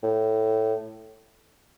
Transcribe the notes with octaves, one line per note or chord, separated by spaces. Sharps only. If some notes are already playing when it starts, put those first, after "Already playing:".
A2